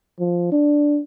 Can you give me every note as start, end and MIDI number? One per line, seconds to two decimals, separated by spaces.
0.19 0.48 53
0.52 1.00 62